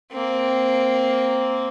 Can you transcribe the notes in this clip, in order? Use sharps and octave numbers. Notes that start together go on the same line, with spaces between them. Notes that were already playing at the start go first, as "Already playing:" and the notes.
A#3 C4